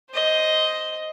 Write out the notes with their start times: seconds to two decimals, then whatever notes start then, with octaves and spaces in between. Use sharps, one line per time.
0.11 C5 D#5